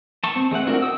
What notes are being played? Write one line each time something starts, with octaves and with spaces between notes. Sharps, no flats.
A5 C#6
C4
G#3 A3 C4 F#5
C4 D4 F4 F#4 A#4
D#5 G5 D#6 E6